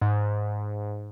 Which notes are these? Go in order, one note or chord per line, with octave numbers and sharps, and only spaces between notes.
G#2